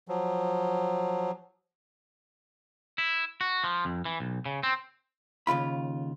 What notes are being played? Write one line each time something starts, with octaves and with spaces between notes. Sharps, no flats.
F3 F#3
E4
F#4
F3
F2
E3
B1
C#3
C4
D#2 C#3 F4 B5